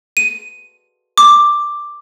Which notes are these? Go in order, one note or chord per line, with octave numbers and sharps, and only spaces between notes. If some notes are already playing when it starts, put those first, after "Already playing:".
D#7
D6